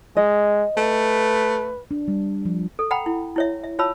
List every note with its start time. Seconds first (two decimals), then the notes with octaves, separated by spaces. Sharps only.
0.17 G#3 D#5
0.77 A3 B4
1.91 D4
2.08 G3
2.45 F3
2.79 A4
2.91 F#5 G5 A#5 B5
3.06 E4
3.36 E4 C#5 E5
3.64 E5
3.79 F4 C#5 F5 A5 B5 E6